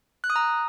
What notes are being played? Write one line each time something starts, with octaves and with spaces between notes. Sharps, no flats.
F#6
D#6
A#5